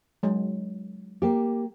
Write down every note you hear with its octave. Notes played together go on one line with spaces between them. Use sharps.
F#3 G#3
A#3 G4